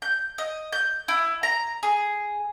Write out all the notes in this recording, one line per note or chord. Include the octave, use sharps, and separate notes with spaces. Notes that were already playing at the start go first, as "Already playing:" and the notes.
G6
D#5
G6
E4
A#5
G#4